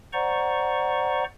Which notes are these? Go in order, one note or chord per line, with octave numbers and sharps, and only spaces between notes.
C5 D5 F#5 A#5 C#6